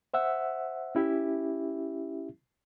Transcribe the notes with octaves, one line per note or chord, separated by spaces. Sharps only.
C5 E5 F#5 E6
C#4 E4 G4 E5